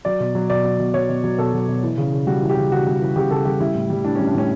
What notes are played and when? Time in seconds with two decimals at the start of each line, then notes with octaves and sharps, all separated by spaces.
0.05 F#3 D5
0.20 B2
0.35 F#3
0.50 B2 D5
0.64 F#3
0.79 B2
0.94 F#3 C#5
1.09 B2
1.24 F#3
1.38 B2 A4
1.53 F#3
1.68 B2
1.83 E3
1.97 C#3
2.13 C#3
2.27 G3 F#4
2.42 E3
2.49 G4
2.57 C#3
2.71 C#3 F#4
2.86 G3
3.01 E3
3.16 C#3 G4
3.31 C#3 A4
3.45 G3 G4
3.60 G3 E4
3.75 A2
3.90 G3
4.05 A2 D4
4.16 G3 C#4
4.27 D4
4.34 A2 C#4